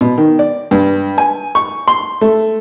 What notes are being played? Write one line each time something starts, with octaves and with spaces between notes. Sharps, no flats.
B2
D#3
D5
G2
G#5
C#6
C6
A3